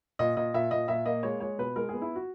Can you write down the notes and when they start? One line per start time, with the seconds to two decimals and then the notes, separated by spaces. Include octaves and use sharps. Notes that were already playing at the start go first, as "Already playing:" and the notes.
0.19 A#2 D#5
0.37 A#2 D#5
0.54 A#2 E5
0.71 A#2 D#5
0.88 A#2 E5
1.06 A#3 D#5
1.23 G#3 C#5
1.40 G#3 C#5
1.58 B2 B4
1.76 G#3 A#4
1.89 B3 G#4
2.02 E4
2.15 F#4